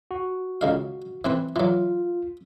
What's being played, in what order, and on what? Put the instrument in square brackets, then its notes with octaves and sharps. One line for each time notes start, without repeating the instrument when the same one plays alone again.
[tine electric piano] F#4
[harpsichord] C#2 D#3 F5
E3 C4 B4
[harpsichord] E3 F#3 [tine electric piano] F4